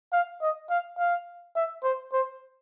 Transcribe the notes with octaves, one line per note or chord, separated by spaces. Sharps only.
F5
D#5
F5
F5
E5
C5
C5